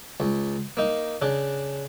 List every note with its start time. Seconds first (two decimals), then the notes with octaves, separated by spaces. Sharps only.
0.20 C#2
0.77 A#3 D#4
1.22 C#3 D4